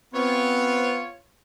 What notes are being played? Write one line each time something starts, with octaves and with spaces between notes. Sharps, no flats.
B3 C4 F4 C#5